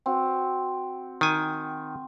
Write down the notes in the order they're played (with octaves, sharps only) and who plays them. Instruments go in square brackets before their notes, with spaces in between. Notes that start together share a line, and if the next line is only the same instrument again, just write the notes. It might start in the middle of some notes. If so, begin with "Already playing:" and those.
[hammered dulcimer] C4 F#4
[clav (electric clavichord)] D#3 G#5